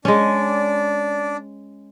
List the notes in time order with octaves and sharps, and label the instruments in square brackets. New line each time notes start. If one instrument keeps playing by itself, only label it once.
[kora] G#3 C#4 [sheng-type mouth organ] D4 D5